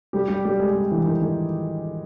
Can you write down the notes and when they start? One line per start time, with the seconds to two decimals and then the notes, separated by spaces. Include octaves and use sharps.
0.13 G3 G4
0.28 G3 G4
0.45 G3 G4
0.60 G#3 G#4
0.75 G3 G4
0.91 E3 E4
1.06 D#3 D#4
1.21 D#3 D#4